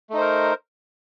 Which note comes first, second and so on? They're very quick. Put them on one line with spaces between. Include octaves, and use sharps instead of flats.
A3 D#4 C5 A#4